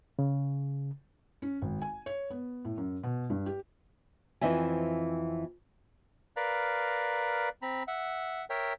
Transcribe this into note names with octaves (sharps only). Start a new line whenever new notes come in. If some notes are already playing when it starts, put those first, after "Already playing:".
C#3
C#4
G#1
G#5
C#5
B3
A2
F#2
B2
G2
G4
F2 E3 C4 D#5 E5 G#5
A#4 B4 D5 F5 A#5
C4 A#5 B5
E5 F#5
A#4 C#5 E5 G5